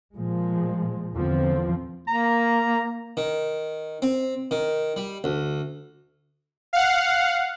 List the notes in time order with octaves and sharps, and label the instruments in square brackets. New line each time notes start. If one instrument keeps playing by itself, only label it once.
[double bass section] A#2 F3 G#3
E2 D3 F3 C4
[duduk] A#3 [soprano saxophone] A#5
[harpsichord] D#3
C4
D#3
G3
D2
[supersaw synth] F5 F#5